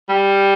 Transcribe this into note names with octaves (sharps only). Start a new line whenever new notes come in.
G3